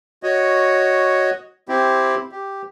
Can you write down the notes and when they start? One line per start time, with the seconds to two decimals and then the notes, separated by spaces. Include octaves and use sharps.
0.23 F#4 C#5 D#5
1.69 C4 E4 G4
2.32 G4